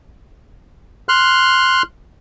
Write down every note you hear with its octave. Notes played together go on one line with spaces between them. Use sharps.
C6 F6 F#6